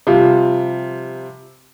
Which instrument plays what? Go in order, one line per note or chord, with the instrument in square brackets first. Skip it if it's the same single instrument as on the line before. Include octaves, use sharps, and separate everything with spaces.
[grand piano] C3 F3 G3 F4